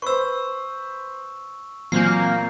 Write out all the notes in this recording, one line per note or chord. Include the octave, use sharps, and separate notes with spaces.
B4 C5 C#6 E6
A#2 E3 F#3 A#3 C4 G#5 G6 C7